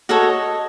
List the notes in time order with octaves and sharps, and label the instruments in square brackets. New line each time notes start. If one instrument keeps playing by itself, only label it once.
[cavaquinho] F#4 A4 C#5 D#5